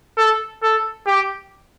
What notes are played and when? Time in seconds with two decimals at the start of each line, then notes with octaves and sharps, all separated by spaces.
0.17 A4
0.63 A4
1.07 G4